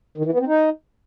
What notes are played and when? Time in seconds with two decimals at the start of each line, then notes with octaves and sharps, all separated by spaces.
0.18 D#3
0.25 E3
0.32 B3
0.40 C4
0.47 D#4